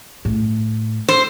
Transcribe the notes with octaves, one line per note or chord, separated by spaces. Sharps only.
A2
C5